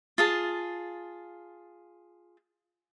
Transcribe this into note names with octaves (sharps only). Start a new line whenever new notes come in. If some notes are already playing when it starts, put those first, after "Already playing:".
F4 G#4 A5